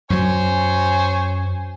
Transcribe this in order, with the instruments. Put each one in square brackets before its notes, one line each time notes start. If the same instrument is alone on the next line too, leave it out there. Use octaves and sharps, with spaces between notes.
[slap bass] F#2 F#3 [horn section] C5 C#5 G#5